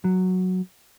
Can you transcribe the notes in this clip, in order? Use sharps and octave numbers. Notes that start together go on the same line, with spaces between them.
F#3